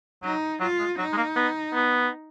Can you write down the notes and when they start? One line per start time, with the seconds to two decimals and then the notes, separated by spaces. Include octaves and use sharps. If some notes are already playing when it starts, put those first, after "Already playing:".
0.23 F#3 D#4
0.60 F#3 F4
0.79 G#3
0.98 F#3 D#4
1.13 G#3
1.17 A#3
1.36 B3
1.74 B3